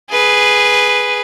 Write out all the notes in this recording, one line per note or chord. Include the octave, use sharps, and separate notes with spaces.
G#4 B4